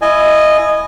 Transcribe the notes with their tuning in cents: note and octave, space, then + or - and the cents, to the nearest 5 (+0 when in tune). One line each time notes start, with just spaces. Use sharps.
E4 +5 D#5 -15 G#5 +10